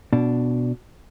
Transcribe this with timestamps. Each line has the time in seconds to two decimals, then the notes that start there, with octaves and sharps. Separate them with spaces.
0.13 B2 D4